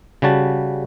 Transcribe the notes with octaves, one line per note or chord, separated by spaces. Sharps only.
C#3 G3 F#4 A5